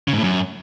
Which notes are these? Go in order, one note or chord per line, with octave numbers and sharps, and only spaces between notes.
C#3
G#2
A2
F#2